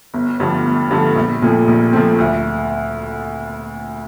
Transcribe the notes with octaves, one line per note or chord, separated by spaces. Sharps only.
G1
G2 D3 F3 A3
G1
G2 D3 F3 A3
A#1
A#2 F3 A3 C4
A#1
A#2 F3 A3 C4
D2